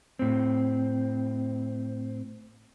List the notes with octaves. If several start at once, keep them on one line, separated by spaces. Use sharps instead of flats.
A2 C4